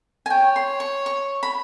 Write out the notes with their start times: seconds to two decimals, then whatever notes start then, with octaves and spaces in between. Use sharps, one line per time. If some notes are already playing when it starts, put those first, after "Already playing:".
0.26 G#5
0.30 C#5 G5
0.56 C6
0.80 C#6
1.06 C#6
1.43 B5